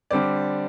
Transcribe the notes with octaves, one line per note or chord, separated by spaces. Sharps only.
D3 G3 C4 D5